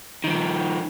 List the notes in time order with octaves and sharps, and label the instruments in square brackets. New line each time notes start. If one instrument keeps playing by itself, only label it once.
[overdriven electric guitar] D#3 F3